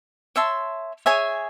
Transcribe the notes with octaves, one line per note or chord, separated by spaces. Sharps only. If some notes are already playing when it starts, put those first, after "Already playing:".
C#5 E5 A5 C6
G#4 C#5 E5 G#5